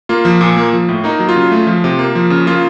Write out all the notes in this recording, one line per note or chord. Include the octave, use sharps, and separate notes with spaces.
A#3 F4
F3
A#2
A#3
F3
A2
A#3 D#4
F#3
F4
C#3
A3
F3
C3
A#3
F3
C#3
A#3 F4